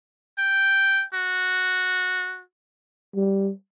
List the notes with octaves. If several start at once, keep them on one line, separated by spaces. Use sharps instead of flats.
G5
F#4
G3